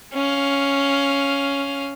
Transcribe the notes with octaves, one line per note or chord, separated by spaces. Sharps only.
C#4 F5